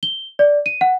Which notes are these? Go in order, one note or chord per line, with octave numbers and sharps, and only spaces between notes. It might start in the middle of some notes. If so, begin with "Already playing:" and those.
G7
D5
D#7
F#5